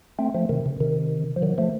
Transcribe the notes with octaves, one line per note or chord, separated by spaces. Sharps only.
A3 C4
F3 A3
C3 D#3
C#3
C3 D#3
F3
D#3 F#3
F3 A3